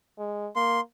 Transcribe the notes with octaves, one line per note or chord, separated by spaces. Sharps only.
G#3
A#3 C6